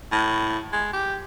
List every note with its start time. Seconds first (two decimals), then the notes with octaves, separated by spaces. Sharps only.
0.12 A2
0.73 G#3
0.93 G4